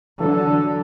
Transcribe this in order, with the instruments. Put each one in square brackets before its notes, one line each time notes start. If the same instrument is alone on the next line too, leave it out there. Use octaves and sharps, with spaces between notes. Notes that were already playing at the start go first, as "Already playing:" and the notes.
[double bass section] D3 [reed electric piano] E3 F#3 [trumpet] A4